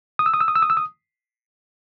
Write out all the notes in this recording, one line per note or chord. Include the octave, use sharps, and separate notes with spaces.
D#6
E6
D#6
E6
D#6
E6
D#6
E6
D#6